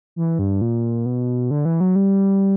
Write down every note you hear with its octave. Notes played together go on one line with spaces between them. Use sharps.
E3
G2
A#2
B2
D3
E3
F#3
G3